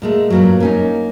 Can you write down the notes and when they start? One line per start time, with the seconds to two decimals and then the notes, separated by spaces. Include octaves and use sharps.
0.02 A#2 G#3 A3
0.30 G2 A#2 F#3
0.60 A#3 C#4 D#4